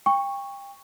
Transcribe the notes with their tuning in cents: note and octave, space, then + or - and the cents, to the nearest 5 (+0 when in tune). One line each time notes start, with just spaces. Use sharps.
G5 +30 C#6 -5